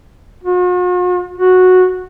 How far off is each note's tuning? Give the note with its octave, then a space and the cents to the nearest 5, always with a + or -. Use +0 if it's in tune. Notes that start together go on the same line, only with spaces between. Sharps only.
F#4 -45
F#4 -10